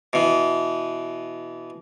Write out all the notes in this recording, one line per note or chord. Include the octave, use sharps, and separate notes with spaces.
B2 E3